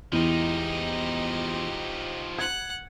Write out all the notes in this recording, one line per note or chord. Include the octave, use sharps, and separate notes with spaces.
E2 F3 D#4 E4 G4 D#5
F#5 F#6 G#6